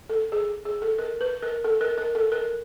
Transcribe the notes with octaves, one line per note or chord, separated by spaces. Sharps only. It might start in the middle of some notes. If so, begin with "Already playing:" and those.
A4
G#4
G#4
A4
A#4
B4
A#4
A4
A#4
A#4
A4
A#4